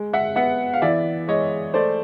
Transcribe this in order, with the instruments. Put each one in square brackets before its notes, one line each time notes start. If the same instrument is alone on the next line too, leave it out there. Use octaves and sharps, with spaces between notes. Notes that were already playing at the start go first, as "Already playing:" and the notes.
Already playing: [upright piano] G#3
E5 F#5
B3 E5 F#5
F5
E3 D5 E5
G#3 C#5 D#5
A3 C5 D5